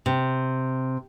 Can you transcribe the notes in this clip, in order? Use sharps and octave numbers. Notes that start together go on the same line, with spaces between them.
C3